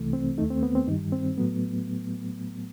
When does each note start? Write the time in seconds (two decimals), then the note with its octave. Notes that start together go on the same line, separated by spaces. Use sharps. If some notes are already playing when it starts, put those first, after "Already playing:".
Already playing: C2 C3 E3 A3
0.13 C4
0.38 D#2 D#3 A3 D#4
0.50 C4
0.63 B3
0.75 C4
0.88 G2 D#3 G3 D#4
1.12 C4
1.37 A2 F#3 A3 B3